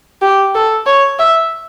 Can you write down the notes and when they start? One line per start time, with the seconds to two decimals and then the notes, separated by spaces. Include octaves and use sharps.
0.22 G4
0.55 A4
0.86 C#5
1.19 E5